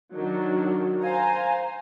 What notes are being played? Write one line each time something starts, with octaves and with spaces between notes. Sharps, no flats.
D#3 F#3 D4
C5 F5 G#5 A#5